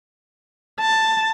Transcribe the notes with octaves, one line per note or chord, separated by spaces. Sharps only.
A5